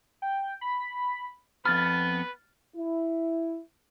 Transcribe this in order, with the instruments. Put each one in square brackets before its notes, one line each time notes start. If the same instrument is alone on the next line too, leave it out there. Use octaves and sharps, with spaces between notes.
[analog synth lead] G5
B5
[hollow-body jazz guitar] F2 B5 [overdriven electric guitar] B3 [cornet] B4 [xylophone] F6 A6
[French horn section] E4